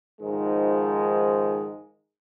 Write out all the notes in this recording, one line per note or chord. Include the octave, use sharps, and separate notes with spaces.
G#2 D#3 F3 G#3